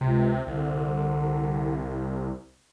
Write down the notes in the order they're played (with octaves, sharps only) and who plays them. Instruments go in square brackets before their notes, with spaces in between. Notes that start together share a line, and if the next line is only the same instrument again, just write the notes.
[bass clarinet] C#2 [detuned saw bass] C3
[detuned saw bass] C2 [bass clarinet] D3